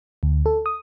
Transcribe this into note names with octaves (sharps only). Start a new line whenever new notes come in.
D2
A4
D#6